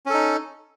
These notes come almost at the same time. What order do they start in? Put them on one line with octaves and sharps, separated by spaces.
C#4 A4 D#4